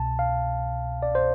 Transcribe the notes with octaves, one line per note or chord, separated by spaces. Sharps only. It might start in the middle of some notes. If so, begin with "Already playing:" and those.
Already playing: C2 B2 A5
F5
D5
C5